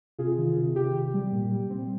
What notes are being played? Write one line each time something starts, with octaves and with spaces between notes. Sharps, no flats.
C3 F4 G#4
D#3
C3
C3 G4
C3
G3
A#2
G3
C4